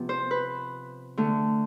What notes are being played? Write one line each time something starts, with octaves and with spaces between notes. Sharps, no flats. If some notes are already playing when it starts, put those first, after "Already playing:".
Already playing: C3 F3 B3
C5
B4
D3 A3